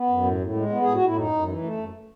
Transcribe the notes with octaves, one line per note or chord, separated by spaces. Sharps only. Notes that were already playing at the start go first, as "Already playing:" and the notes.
Already playing: B3
F#2
A2
A2
G#3
B3
A2 G#4
F#4
A2 E4
F#2 D#4
F#2
E3
A3
F#2